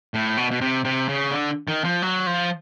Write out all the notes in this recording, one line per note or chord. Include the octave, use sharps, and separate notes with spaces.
A2
B2
B2
C3
C3
C#3
D3
D#3
F3
F#3
F3